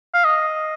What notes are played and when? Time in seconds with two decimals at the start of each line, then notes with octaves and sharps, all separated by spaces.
0.14 F5
0.25 D#5